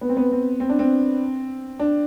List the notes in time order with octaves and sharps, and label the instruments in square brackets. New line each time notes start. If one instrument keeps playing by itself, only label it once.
[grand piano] B3
C4
B3
C4
C4
D4
C4
D4